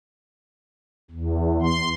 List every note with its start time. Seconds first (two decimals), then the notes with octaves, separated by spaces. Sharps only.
1.11 E2
1.62 C6